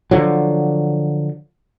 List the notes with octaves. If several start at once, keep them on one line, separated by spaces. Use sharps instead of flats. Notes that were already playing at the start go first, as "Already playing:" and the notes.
D3 F3 F#3